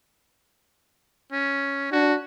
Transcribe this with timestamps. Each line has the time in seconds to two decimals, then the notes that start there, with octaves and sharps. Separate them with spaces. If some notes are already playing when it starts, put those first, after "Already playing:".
1.32 C#4
1.92 D4 F#4